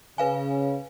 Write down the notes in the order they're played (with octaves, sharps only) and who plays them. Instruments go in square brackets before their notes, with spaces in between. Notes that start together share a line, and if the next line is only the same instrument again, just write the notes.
[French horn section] C#3 [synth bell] B4 F5 G#5